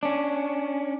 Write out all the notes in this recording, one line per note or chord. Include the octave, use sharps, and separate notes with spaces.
C#4 D4